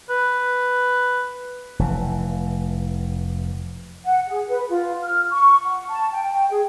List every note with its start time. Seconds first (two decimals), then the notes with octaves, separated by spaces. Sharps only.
0.10 B4
1.79 F1 E3
4.04 F#5
4.28 G#4
4.48 B4
4.70 F4
5.03 F6
5.31 C#6
5.66 F#5
5.89 A5
6.12 G5
6.51 G#4